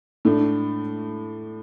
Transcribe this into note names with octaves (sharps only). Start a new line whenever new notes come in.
A2 A3 D4